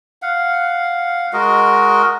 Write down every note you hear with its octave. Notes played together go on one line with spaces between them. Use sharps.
F5 F#5
G#3 F#4 A#4 D#5